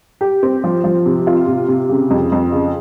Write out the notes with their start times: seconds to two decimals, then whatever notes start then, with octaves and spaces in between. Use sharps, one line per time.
0.21 G4
0.43 C4
0.64 F3
0.84 F3
1.06 C3
1.27 F4
1.47 C3
1.68 C3
1.89 C#3
2.10 F2
2.32 F2
2.52 C#3